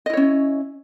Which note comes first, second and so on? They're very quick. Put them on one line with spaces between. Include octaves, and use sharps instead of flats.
D#5 E4 C#5 C#4